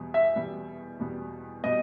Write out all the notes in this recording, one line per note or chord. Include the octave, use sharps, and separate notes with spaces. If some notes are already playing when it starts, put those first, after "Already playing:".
Already playing: E2 B2 G3
E5
E2 B2 G3
E2 B2 G3
B2 G3 D#5